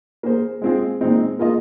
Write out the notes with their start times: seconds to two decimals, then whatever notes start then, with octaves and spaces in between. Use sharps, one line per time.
0.23 A#3 G#4 C5
0.62 G#3 C4 F4 G#4
1.01 A#2 G#3 C4 D#4
1.39 A#3 F4 G#4 D#5